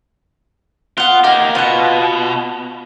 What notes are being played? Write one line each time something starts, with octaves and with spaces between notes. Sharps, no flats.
B3 F4 F#5
A#3 D#4 G4 F5
B2 F4 F#5